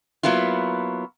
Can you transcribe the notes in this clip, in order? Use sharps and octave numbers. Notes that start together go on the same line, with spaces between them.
F#3 A#3 B3 E4 F4